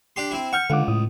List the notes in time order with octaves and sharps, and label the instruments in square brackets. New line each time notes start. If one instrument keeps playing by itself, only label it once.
[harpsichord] D4 G4 C6
C4 E4
[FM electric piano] F#5 F6 G6 [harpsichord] C#6
[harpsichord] C#2 [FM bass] D3 [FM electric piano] F5 F#5 D6
[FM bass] A2 [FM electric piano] D#6